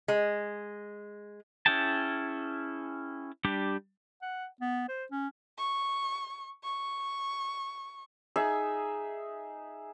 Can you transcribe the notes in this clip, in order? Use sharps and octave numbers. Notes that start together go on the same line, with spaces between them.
G#3
C#4 E4 G#4 G5 A5
G3 D4 G4
F#5
B3
C5
C#4
C#6
C#6
D#4 G#4 E5